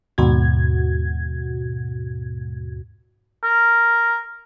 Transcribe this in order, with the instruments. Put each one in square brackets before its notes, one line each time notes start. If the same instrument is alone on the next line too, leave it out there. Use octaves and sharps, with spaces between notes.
[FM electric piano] D#2 G#2 B2 F#4 G#6
[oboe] A#4